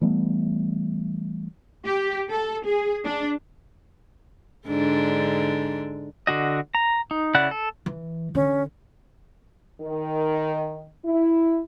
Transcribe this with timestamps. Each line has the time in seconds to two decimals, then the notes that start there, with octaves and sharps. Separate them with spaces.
0.01 E3 G3 A3 B3
1.86 G4
2.30 A4
2.65 G#4
3.04 D4
4.67 G#2 D3 D4
6.27 D3 F#4 D#5
6.75 A#5
7.11 D#4
7.35 C#3 E4 D5 F#5 F#6
7.51 A4
7.86 E3
8.35 D3 C#4
9.81 D#3
11.05 E4